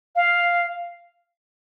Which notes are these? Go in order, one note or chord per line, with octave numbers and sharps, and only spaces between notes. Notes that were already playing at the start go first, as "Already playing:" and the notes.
F5